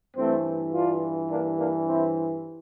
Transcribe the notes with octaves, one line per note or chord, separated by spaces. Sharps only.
G2 E3 A3 C4
D4 F4
A#3 D4
A#3 D4
C4 E4